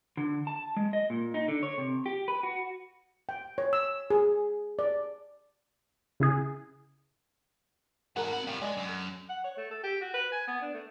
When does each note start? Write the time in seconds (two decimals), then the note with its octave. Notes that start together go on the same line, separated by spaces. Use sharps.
0.17 D3
0.47 A5
0.77 G#3
0.93 D#5
1.10 A#2
1.34 D#4
1.48 D3
1.63 C#5
1.78 C3
2.06 G4
2.28 B4
2.43 F#4
3.29 G5
3.58 C#5
3.73 E6
4.10 G#4
4.79 D5
6.20 C#3 E4 G#4
8.16 G#2 F#4 A4 A#4 F#5
8.33 C4 B5
8.47 A2 G3 F5 G5
8.62 G#3 D5 D#5
8.77 F#2
8.89 A4
9.29 F#5
9.44 C#5
9.57 A3
9.71 A4
9.84 G4
10.01 F#4
10.14 B4
10.32 G#5
10.47 B3
10.62 D4
10.74 A3